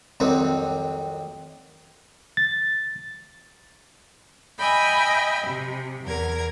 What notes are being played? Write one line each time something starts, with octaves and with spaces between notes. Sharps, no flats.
C2 F2 D#3 F#3 C4
A6
D#5 E5 G5 G#5 B5
C3
E2 A#4 G#6